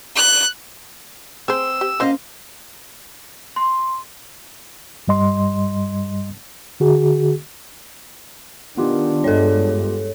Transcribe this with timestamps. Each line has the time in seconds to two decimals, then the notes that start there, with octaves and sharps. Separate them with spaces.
0.16 F#6
1.48 C4 G#4 C5 E6
1.81 G4
2.00 A#3 C#4 F#4 C5 D#5 F5
3.56 C6
5.08 G2 G3 D#5 C6
6.80 D3 F#4 G#4
8.77 D#3 B3 D4 F4 G4
9.24 G2 G#3 A4 C#5